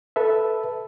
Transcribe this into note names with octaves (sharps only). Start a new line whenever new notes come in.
A4 B4 E5